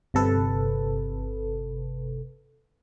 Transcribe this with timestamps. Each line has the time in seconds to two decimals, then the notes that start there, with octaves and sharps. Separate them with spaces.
0.14 G1 C3 A4 B4